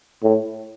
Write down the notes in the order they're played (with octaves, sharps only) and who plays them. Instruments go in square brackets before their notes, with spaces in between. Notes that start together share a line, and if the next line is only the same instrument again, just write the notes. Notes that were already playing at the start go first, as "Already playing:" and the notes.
[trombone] A2